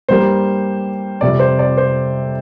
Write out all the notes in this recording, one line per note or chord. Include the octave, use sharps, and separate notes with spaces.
G2 G3 A#3 C5
F2 C3 G3 C4 D5
C5
D5
C5